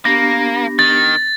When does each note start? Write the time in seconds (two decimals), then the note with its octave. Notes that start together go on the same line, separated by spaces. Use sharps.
0.05 A#3 B3 D4 G4 A#6
0.79 D#3 A6